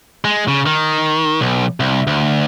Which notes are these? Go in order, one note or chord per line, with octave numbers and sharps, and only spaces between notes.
G#3
C#3
D#3
B1
C2
D2